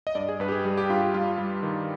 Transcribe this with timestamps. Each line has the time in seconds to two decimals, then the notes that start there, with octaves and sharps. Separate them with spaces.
0.07 D#5
0.15 G2 D5
0.29 G#4
0.40 G2 B4
0.48 G4
0.52 G#4
0.65 G3
0.77 G4
0.89 G2 F4
1.02 G4
1.14 G3 F4
1.38 G3
1.63 D#3